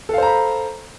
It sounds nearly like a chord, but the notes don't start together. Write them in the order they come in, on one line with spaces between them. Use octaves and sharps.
A4 F5 C5 A#5 B5